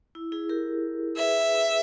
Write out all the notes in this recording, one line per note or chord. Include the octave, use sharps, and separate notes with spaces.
E4
E4 G#4
G4 A#4
G#4 B4 E5